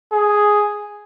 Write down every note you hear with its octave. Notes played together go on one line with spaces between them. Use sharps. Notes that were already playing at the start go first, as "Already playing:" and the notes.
G#4